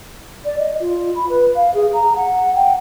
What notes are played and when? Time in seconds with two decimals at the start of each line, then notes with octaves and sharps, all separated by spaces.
0.45 D5
0.59 D#5
0.80 F4
1.15 B5
1.29 B4
1.55 F5
1.74 G#4
1.93 A#5
2.16 F#5
2.55 G5